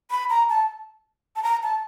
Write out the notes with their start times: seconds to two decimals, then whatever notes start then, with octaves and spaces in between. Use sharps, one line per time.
0.11 B5
0.30 A#5
0.49 A5
1.36 A5
1.43 A#5
1.63 A5